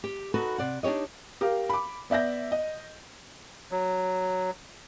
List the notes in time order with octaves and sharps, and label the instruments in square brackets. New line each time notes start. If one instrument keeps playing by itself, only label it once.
[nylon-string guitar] G4
D#4 F#4 A4 B4
C3 D5 F#5
D4 D#4 G4 C#5 D#5
[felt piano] G4 A#4 F5
B5 D6
B3 D5 E5 G6 A#6
D#5
[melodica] F#3